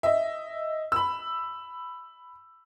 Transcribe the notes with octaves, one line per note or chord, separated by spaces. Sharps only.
D#5 E5
B5 E6